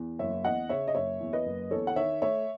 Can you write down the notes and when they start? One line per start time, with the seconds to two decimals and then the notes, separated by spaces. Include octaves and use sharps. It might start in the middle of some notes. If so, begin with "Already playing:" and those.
Already playing: E2
0.19 F#1 C#5 E5
0.44 E2 D#5 F#5
0.69 C#3 C#5 E5
0.88 D#5
0.95 F#1 C#5 E5
1.20 E2
1.33 B4 D#5
1.45 F#1
1.71 E2 A4 C#5
1.87 F#5
1.96 D#3 C#5 E5
2.22 A3 C#5 E5